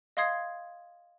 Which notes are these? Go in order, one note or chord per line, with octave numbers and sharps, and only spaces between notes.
D#5 F5 C6 D#6 G#6 C7